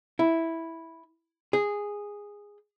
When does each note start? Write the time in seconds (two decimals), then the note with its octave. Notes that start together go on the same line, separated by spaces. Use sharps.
0.19 E4
1.53 G#4